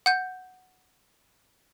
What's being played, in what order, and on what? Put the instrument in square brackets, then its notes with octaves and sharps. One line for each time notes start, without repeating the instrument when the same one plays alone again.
[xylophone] F#5 G6